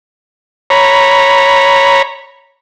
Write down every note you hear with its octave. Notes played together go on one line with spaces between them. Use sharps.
C#5 A#5 B5